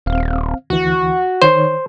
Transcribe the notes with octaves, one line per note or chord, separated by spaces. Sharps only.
D#1 C4 F5
D2 E3 F#4
D#3 C5 C#5